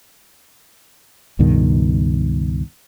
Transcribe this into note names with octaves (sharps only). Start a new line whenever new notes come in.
C#2 G2 B2 D#3